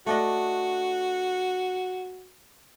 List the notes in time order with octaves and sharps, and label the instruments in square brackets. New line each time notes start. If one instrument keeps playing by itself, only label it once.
[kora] A3 D4 D#5 [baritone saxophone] F#4